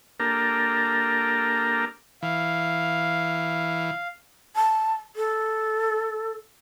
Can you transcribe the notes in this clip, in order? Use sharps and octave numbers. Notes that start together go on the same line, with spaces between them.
A#3 D4 G4 A4 A#4
E3 F5
A5
A4